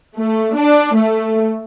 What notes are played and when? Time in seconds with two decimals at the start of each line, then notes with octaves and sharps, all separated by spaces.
0.17 A3
0.57 D4
0.97 A3